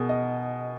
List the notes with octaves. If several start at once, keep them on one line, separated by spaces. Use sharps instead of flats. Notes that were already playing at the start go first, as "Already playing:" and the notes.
Already playing: B2 G#4 A#4
D#5